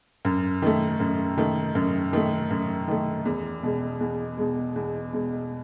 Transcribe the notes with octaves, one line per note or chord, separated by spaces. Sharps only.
F#2
D#3 A3
F#2
D#3 A3
F#2
D#3 A3
F#2
D#3 A3
E2
B2 G#3
E2
B2 G#3
E2
B2 G#3